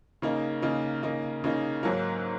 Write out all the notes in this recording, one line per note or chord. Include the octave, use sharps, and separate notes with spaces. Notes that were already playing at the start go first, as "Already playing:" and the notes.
C#3 A#3 D#4
C#3 A#3 D#4
C#3 A#3 D#4
C#3 A#3 D#4
G#2 F#3 A#3